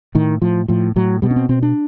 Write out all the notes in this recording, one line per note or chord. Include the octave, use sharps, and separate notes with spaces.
A2 D#3
A2 F3
A2 F3
A2 F#3
B2 G3
C#4
C4
B2 C4
D4